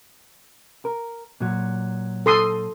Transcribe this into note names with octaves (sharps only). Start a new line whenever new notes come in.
A#4
A#2 F#3
A4 C6 D#6